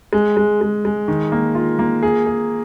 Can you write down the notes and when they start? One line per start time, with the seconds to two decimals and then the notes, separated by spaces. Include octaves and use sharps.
0.13 G#3
0.37 G#3
0.61 G#3
0.85 G#3
1.08 D#3
1.32 A#3
1.55 F4
1.79 A#3
2.03 G#4
2.26 G#4